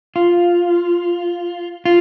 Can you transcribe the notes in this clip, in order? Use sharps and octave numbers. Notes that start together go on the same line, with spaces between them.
F4
F4